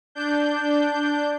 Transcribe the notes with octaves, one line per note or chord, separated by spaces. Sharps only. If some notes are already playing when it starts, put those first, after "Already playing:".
D4 G6